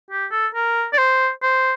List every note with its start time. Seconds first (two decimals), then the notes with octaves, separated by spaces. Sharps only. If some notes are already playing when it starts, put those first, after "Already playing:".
0.10 G4
0.31 A4
0.55 A#4
0.93 D5
0.98 C5
1.42 C5